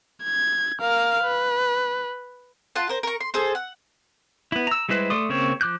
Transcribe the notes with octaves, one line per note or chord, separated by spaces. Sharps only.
G#6
A#4 F5
B4
F4 F#5 A5
A#4 C5
A#4 C#6
C6
G#4 A4 C5
F#5
B3 E4
A#5 E6
G3 G#3 E4 B4 C5
A3 D5 C6 D#6
C#3 A#3 C4 C#5
F3 D6 F#6 G6